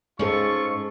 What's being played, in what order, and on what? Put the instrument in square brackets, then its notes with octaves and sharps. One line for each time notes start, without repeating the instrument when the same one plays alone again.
[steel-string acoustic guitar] G#2 C#4 [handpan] G#3 A4 [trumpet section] F4 C#6